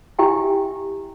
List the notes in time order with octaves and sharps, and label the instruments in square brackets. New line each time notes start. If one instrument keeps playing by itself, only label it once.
[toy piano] E4 G4 E5 G5 G#5